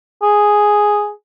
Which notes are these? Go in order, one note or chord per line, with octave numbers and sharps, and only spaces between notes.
G#4